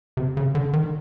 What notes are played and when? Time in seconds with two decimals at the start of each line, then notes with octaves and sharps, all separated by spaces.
0.17 C3
0.37 C#3
0.55 D3
0.73 D#3